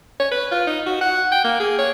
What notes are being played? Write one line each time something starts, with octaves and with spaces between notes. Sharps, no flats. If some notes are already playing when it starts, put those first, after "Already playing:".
C#5
B4
F4
D#4
F#4
F#5
G5
A#3
G#4
C#5